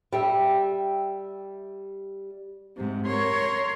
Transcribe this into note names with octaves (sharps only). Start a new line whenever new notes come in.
G3 G4 E5
G#2 C3
A#4 C#5 C6